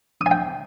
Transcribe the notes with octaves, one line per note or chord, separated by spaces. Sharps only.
D#6
G#5
G5